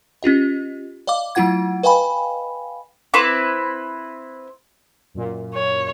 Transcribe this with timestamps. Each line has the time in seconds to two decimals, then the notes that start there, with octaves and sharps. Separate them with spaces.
0.23 C#4 F4 G4 D#5
1.07 D5 D#5 F5 D6
1.35 F#3 A3 E4 F4 F#5 G#6
1.83 B4 D#5 F5 G5 G#5 B5
3.14 C4 E4 B4 D6
5.14 F#2 A#2
5.54 C#5